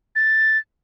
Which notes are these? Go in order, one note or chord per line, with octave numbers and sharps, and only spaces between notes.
A6